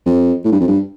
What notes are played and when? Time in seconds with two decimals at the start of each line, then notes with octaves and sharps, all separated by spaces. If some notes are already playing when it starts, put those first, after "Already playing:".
0.06 F2
0.45 A2
0.52 G2
0.60 F2
0.68 G2